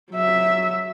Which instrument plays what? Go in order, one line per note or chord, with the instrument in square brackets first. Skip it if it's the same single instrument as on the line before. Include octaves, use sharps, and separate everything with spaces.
[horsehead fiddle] F#3 E5